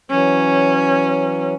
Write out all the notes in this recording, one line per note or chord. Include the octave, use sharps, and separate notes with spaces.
E3 F#3 C#4